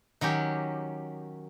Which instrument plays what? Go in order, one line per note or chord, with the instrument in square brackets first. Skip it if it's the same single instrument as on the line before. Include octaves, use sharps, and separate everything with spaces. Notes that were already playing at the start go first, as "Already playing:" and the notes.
[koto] D#3 F#3 C#4 G4